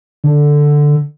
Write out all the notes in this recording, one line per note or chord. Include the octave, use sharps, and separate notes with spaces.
D3